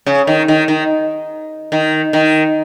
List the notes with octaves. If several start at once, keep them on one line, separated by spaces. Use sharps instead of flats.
C#3
D#3
D#3
D#3
D#3
D#3